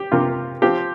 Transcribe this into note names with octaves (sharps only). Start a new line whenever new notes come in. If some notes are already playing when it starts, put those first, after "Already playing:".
Already playing: G4
C3 A#3 F4
F3 C4 F4 G4